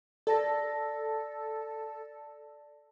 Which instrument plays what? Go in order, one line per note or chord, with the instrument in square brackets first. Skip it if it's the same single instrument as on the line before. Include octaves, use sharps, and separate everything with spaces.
[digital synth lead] A4 [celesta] D5 A5 A#6